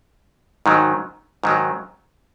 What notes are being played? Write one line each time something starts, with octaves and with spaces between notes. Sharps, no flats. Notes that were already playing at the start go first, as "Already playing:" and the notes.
G#2 D#3 F#3
G#2 D#3 F#3